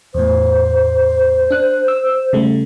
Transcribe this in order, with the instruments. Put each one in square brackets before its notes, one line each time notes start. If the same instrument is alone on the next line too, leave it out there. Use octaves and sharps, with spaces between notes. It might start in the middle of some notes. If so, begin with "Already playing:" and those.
[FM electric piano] E2 A2 [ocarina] C5
[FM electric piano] D4 F#6
E6
C#3 G3 A3